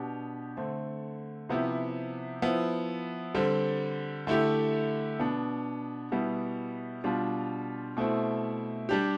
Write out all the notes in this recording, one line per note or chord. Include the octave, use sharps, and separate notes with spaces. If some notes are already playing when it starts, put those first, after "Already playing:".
Already playing: B2 B3 D4 G4
D3 A3 C4
C3 F3 B3 E4 G4
F3 B3 E4
D3 G3 C4
D3 A3 E4 G4
B2 B3 D4
B2 G3 B3 E4
B2 G3 D4 F4
B2 A3 C4 E4
G3 D4 G4